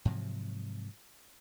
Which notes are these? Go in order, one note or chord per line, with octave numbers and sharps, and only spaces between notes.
G#2 C3 F3 F#3